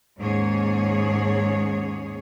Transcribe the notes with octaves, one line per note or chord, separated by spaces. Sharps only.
D#2 G#2 C#4 G#4 C#5